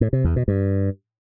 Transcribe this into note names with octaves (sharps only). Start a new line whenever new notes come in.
A2
C3
E2
B2
G2